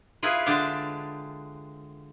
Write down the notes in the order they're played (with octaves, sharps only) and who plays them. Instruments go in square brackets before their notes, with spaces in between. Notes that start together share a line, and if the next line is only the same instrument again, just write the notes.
[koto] E4 F4 G#4 B4
D3 G#3 D4 G4 A5